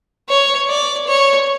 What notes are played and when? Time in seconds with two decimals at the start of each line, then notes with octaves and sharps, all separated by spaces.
0.29 C#5
0.69 D5
1.07 C#5